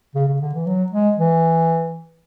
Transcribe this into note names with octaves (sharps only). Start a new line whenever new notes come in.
C#3
C#3
D3
E3
F#3
G#3
E3